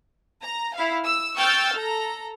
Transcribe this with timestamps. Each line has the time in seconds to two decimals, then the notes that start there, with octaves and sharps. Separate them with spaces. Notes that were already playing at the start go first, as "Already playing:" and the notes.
0.42 A#5
0.75 E4 F5
1.05 E6
1.37 G5 C#6 E6 F6 G6 A6
1.74 A4 A#5